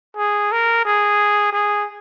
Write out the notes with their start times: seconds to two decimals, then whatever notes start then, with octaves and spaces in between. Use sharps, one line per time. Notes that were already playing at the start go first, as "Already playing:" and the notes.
0.17 G#4
0.52 A#4
0.85 G#4
1.53 G#4